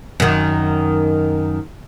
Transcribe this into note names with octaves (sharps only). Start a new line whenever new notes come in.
F#2 D#3